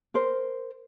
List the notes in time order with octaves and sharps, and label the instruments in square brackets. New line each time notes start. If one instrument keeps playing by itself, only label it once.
[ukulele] A#4 C5